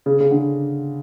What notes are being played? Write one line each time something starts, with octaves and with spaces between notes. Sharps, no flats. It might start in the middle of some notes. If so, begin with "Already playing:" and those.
C#3
C#3
D3